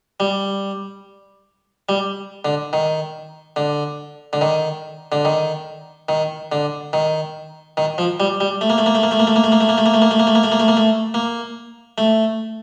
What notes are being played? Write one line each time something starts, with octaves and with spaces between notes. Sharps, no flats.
G3
G3
D3
D#3
D3
D3
D#3
D3
D#3
D#3
D3
D#3
D#3
F3
G3
G3
A3
A#3
A3
A#3
A3
A#3
A3
A#3
A3
A#3
A3
A#3
A3
A#3
A3
A#3
A3
A#3
A3
A#3
A3
A#3
A3
A#3
A3
A#3
A3
A#3
A3